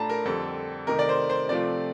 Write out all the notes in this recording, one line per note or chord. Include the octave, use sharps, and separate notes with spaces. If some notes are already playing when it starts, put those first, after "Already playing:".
Already playing: A2 A3 D4 F4 A5 A#5
A#4
F2 D3 G3 C4 A4
C3 D#3 A3 D#4 A#4
D5
C5
C5
C3 F3 A3 C4 F4 D5